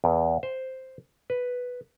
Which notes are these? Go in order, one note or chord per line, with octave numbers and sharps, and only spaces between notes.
E2
C5
B4